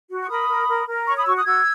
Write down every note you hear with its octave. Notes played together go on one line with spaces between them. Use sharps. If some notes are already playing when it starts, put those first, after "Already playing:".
F#4
C#6
A#4 B5 D#6
A#4
A#4
A#4
C#5 A#5 C#6
B5 D#6
F#4 C#6 E6
D#6 F#6
F#4 E6 G#6